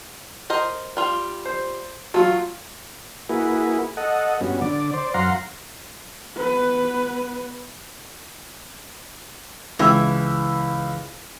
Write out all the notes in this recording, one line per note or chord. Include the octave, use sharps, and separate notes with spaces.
A#4 C5 D#5
G3 F4
C5
F#3 A3 F4
A#3 E4 F#4 G#4 B4
A4 D#5 F#5
G2 B3 C#4 F#4
D3 D5
C5 D5
F#2 F5 F#5 A#5 C6
B3 B4
C#2 E3 E6